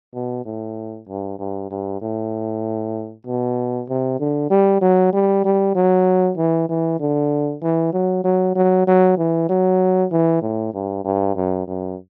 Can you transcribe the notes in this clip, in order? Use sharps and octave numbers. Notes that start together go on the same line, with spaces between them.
B2
A2
G2
G2
G2
A2
B2
C3
D3
G3
F#3
G3
G3
F#3
E3
E3
D3
E3
F#3
F#3
F#3
F#3
E3
F#3
E3
A2
G2
G2
F#2
F#2